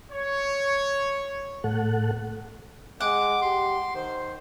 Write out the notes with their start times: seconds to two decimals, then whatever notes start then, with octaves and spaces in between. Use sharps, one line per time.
0.12 C#5
1.64 A2 A4 F#5
3.01 G#3 F#5 D6
3.42 G4 C6
3.95 D#3 C5